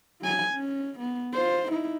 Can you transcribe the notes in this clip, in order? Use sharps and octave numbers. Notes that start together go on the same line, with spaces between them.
F#3 G#5
C#4
B3
F4 C5
D#4 E4